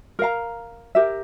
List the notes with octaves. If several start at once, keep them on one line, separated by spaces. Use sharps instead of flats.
A#4 F5 A#5
G4 A#4 E5